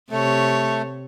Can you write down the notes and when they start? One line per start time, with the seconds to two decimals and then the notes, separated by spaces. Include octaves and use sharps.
0.11 C3 A3 C#5